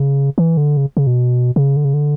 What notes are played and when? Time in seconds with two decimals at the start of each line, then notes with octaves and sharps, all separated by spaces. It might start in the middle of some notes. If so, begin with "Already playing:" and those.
Already playing: C#3
0.38 E3
0.57 D3
0.77 C#3
0.97 C#3
1.07 B2
1.56 C#3
1.76 D3
1.85 C#3
1.94 D3